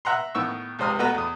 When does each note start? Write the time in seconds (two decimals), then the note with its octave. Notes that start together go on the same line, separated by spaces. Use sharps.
0.05 E5 F#5 A#5 C6
0.35 A2 D#3 B3 C#6 E6
0.79 C#2 C3 C5 D#6 F6
0.99 B2 A3 B3 F#4 B4 A#5
1.15 E2 D#6